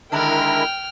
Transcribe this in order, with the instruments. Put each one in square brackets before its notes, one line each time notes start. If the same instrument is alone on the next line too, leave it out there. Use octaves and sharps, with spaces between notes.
[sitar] D3 D#3 D4 [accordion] G#3 E4 A#4 [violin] G5 F6